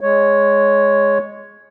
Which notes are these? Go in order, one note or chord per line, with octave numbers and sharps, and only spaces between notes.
G#3 C#5